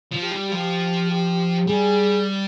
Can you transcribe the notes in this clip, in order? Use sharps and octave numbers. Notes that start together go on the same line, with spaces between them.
F3
G4
G3
F3 G4
G4
G3 G#4